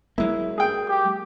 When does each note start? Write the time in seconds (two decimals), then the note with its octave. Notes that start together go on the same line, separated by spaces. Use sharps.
0.18 F#3 G#3 A#3 E4
0.58 G#4 G5
0.89 G4